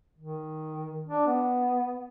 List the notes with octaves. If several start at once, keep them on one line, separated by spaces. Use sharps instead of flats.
D#3
D4
B3